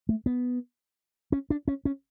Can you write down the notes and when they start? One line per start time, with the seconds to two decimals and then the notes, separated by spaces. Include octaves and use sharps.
0.09 A3
0.26 B3
1.32 C#4
1.50 D4
1.68 C#4
1.85 C#4